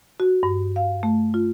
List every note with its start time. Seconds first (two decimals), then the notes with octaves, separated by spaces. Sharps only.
0.20 F#4
0.43 G2
0.76 F5
1.03 A3
1.34 F4